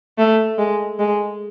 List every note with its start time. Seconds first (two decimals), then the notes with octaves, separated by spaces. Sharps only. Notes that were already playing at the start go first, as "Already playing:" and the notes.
0.18 A3
0.58 G#3
0.99 G#3